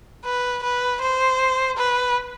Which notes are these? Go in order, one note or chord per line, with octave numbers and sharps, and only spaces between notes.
B4
B4
C5
B4